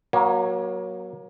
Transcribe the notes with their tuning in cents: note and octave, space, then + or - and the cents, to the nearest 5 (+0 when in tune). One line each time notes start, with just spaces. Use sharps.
F#3 +0 A#3 +30